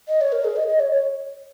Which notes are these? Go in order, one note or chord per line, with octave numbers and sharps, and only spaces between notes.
D#5
C#5
A#4
G#4
D#5
D#5
C#5
C#5